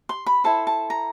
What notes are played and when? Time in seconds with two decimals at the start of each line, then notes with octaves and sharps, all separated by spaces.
0.09 C6
0.26 B5
0.44 E4 A4 C5 A5
0.67 A5
0.90 A#5